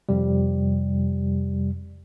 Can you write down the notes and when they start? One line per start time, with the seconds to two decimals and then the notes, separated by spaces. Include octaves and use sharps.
0.09 F2 C3 G3